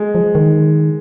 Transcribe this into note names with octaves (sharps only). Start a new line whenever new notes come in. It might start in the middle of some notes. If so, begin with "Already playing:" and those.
Already playing: G#3
F3
D#3